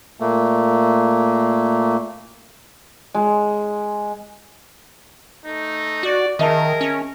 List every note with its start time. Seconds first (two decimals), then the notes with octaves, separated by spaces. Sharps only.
0.20 A#2 A3 A#3
3.14 G#3
5.45 A3 D#4
6.03 F#4 D5
6.39 D#3 G#4 A#4 D#5 E5 A5
6.81 C#4